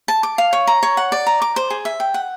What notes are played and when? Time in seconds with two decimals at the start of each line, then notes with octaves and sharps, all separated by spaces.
0.08 A5
0.23 D6
0.38 F5
0.53 C#5
0.67 A#5
0.83 C#5
0.97 F#5
1.12 D5
1.27 A#5
1.42 D6
1.56 C5
1.70 G#4
1.85 E5
2.00 G5
2.14 F#5